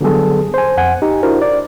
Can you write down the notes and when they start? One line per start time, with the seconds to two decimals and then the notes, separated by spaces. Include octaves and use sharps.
0.01 D3 F#3 G3 B3 G#4 A4
0.54 C5 G#5
0.77 F2 F#5 G#5
1.02 D#4 G4
1.23 D4 E4 F#4 A#4 C5
1.42 D5